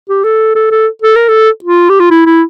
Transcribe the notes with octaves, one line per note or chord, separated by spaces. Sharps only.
G4
A4
A4
A4
A4
A#4
A4
F4
G4
F4
E4
E4